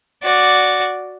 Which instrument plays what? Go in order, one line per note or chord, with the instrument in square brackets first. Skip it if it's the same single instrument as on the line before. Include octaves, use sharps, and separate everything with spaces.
[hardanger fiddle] F#4 D5